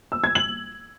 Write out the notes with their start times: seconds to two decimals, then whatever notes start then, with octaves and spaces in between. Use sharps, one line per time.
0.12 E6
0.24 G#6
0.35 F#7